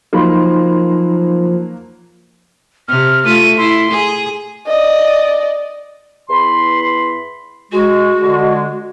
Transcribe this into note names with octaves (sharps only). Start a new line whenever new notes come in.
F3 F#3 A#3 D#4 B5 C6
C3 F6
A3 F4 D#7
E4 C6
G#4
D5 D#5
E2 B5 C6
G#3 F#4
D3 G#3